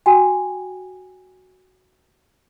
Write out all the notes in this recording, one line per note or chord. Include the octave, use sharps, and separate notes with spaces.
F#4 G5 G#5